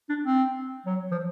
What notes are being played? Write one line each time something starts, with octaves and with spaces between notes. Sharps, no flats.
D4
C4
F#3
F3